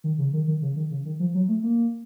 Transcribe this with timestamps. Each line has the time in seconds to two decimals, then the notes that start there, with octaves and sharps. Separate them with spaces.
0.04 D#3
0.18 C#3
0.33 D#3
0.47 D#3
0.62 C#3
0.76 D#3
0.91 C#3
1.05 D#3
1.20 F3
1.34 F#3
1.48 A3
1.63 A#3